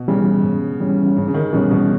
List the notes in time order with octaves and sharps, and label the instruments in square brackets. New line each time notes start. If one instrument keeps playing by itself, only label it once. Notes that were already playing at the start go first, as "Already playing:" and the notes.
Already playing: [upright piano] B2
[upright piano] C#3 [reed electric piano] E3 G3 C#4
[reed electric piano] G#2
E3 G3 C#4
[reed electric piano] G#2 [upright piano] C#3
[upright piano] C#3
D#3
[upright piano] B2 [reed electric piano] E3 G3 C#4
[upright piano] B2